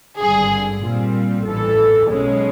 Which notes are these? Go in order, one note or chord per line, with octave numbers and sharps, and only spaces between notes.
G#1 G2 D3 G#4
A#2 G3 C4 F4
A1 G2 E3 A4
B1 B2 G#3 C#4